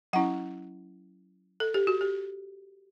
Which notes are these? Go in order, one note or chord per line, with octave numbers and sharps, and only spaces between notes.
F#3 C#4 E4 F#5
A4
G4
F#4
G4